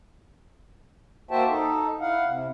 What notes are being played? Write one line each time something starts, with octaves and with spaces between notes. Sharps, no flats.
A#3 F#4 C5 E5 G5 A5
D#4 A4
E4 F5 F#5
C3